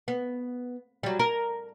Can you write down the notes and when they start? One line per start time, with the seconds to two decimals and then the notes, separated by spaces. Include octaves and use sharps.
0.08 B3
1.03 F#3 G3
1.19 A#4